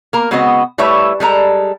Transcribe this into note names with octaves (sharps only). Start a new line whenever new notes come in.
A#3 A#4
C#3 G#3 B3 C4 F#4 D#5
G3 A3 E4 B4 C#5 E5
G3 G#3 A4 A#5